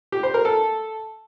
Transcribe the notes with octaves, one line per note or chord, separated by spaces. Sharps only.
G4
C5
A#4
A4